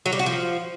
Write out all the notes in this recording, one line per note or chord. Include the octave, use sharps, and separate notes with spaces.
F#3
G3
F#4
F3